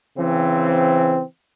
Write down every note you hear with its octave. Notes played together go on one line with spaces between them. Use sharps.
C#3 E3 C4